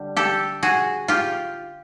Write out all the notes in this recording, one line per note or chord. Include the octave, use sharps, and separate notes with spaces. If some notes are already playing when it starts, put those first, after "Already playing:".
Already playing: D3 G3
G4 A4
F#4 G#4
F4 G4